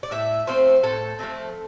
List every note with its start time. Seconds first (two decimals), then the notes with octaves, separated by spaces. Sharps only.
0.03 D5
0.11 A2 E5
0.47 F3 A3 C4 C5
0.83 A2 A4
1.19 F3 A3 C4